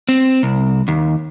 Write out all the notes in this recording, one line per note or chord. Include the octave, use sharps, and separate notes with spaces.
C4
C2
D#2